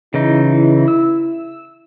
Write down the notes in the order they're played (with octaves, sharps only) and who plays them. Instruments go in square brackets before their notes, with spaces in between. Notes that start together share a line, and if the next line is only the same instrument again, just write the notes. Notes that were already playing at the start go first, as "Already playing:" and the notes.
[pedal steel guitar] C#3 E3 D#4 [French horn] E4
[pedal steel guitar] E6